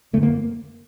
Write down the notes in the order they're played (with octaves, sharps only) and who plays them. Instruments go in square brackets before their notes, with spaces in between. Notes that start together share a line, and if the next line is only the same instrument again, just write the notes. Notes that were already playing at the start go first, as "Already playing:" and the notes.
[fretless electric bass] D3 A3
F#2
A#3